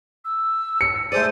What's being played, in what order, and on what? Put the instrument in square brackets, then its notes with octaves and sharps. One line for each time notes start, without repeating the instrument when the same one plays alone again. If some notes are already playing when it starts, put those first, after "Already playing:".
[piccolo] E6
[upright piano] C#7
[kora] A3 G#4 D5 [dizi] C5 [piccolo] D#7